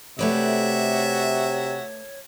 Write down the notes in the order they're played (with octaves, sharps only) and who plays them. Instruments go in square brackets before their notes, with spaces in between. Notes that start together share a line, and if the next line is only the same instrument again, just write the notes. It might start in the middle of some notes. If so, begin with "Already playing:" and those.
[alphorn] C3 [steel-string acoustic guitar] A3 B4 D5 [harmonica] F#4 E5 [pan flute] C#5